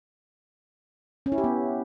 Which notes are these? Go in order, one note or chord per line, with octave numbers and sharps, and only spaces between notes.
C#4
E4
G4
B3